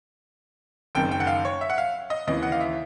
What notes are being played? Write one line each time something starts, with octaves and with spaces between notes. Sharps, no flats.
F#1 F#2 D#3 G5
G5
F#5
F5
C#5
E5
F#5
F5
D#5
D#2 C#3 E3 D#5
F#5
F5
E5